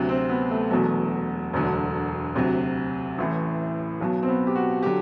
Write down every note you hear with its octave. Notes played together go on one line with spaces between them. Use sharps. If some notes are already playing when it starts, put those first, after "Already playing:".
Already playing: D2 C3 F#3
C4
B3
A3
E1 E2 B2 F#3 A3
E1 D2 D3 F#3
D2 C3 F#3
A1 A2 E3
B1 B2 F#3
C4
B3
G4
F#4
D3 F#3 G4